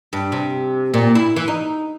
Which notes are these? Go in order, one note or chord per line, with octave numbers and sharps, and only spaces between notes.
G2
C3
A#2
E4
E3
D#4